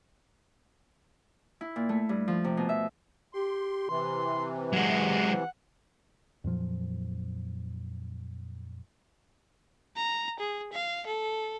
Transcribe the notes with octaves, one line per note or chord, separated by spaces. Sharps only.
E4
A#2
A3
G2
F3
C3
B2
E5
G4 C6
C3 E3 C6
F#3 G#3 F#5
F2 A#2 F3 F#3
A#5
G#4
F5
A4